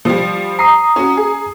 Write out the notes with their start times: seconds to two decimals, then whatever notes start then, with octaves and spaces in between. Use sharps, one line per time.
0.05 F3 G3
0.59 A#5 D#6 C7
0.96 C#4 F#4
1.17 G#4